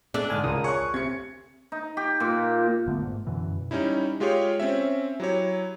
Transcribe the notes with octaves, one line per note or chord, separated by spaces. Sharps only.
G#3 A3 D4 E5 F#6
G#2 D3 G#5 D#6 F6
C#2 F4 A#4 A#5 D#6
G#4 C#5 C#6 F#6 C#7
D2 C3 G#6 C#7
D#4
G4
A#2
G1 D3 A3 B3
G#2
F#2 B2 D3 E3
G3 C#4 D#4 E4
G#3 F4 G4 G#4 C#5
C4 C#4 E5
F#3 E4 G4 C#5